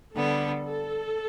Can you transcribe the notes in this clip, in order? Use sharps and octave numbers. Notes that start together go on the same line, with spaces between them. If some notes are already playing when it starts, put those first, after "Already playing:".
D3 G3 B3 A4
A4